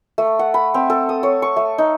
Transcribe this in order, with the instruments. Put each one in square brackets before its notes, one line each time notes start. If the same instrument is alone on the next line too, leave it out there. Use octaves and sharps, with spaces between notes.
[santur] A3
F#5
B5
C4
A4
D#6
C#5
C#6
A3
D#4